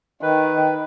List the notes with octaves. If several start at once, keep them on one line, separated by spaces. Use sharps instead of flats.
D#3 B4